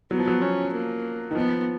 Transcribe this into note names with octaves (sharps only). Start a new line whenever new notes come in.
F#3 B3
F3
F#3
C#4
A#3
D#3
F3 B3